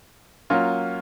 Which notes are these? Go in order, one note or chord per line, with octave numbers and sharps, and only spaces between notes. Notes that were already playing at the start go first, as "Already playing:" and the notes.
F#3 A#3 C#4 F4